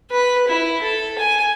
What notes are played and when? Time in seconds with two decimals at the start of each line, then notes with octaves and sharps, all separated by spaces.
0.11 B4
0.48 E4
0.82 A4
1.19 G#5